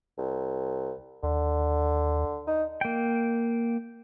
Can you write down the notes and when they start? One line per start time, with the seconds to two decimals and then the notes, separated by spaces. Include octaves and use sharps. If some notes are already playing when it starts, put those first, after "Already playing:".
0.18 C2
1.23 D#2 D3
2.47 D#4
2.81 A#3 G5